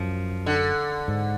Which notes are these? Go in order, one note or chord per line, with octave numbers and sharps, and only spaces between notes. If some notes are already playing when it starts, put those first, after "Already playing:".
Already playing: F#2 F3
D3
G#2